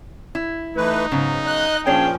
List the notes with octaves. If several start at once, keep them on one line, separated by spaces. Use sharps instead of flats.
E4
E3 A3 D#4 B4
G#2 C#3 F#3 B3
D#5 F#6
A#2 F3 C#4 D4 G#4 C#5 G5